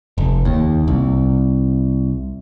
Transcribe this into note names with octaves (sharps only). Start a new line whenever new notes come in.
F1
D#2
C2